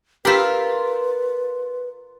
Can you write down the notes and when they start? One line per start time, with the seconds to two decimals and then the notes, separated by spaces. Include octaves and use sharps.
0.25 F4 G4 A#4 B4 B5 E6